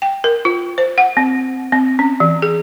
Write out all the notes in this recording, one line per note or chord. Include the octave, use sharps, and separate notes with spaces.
G5
A#4
F4
C5
F#5
C4
C4
C#4
E3
G#4